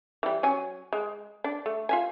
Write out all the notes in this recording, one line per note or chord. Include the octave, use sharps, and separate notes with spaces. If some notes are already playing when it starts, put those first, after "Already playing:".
E3 G3
F#3 C#4 G#5
G#3
D4
A3
F4 E5 G#5